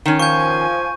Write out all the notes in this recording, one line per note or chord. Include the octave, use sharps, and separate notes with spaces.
D#3 C#4
F3 G#5 C#6 G6